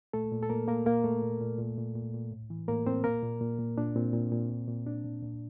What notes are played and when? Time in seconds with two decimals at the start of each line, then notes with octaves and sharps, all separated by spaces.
0.13 A#2 A3 A4
0.32 A#2
0.43 A4
0.50 A#2 A#3 A#4
0.68 A#2 A#3 A#4
0.86 A#2 A#3 A#4
1.04 A#2 A3 A4
1.22 A#2
1.41 A#2
1.58 A#2
1.78 A#2
1.95 A#2
2.14 A#2
2.31 A2
2.50 E3
2.68 A2 A#3 A#4
2.86 A2 C4 C5
3.04 A#2 A#3 A#4
3.23 A#2
3.41 A#2
3.59 A#2
3.78 A#2 D4
3.96 A#2 C4
4.13 A#2
4.32 A#2
4.50 A#2
4.68 A#2
4.87 A#2 D4
5.05 A#2
5.23 A#2